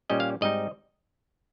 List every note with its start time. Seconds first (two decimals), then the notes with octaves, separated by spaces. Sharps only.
0.10 A#2 G3 C#4 D#5
0.20 F5
0.41 G#2 G3 C4 D#4 D#5